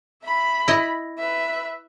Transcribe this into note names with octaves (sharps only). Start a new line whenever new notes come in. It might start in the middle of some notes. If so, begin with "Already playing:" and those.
E5 B5
E4 D#5
B4 E5